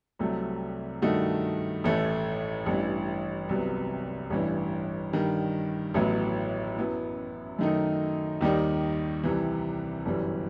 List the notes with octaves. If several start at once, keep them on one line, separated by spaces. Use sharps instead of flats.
C2 C3 F#3 A3
G2 D#3 A3 D#4 F#4
A1 A2 E3 A3
A1 G2 E3
C2 C3 F#3 B3
A1 G2 E3
G2 D#3 G3
A1 A2 F#3 B3 E4
F#2 F#3 B3 E4
F#2 D#3 A3 D#4
D#2 D#3 G3 D#4
C2 C3 E3
G1 F#2 E3 G3